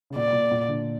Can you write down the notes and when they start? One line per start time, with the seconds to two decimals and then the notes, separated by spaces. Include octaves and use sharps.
0.10 C#3
0.16 A#2 D5
0.33 A#2
0.51 A#2
0.69 D3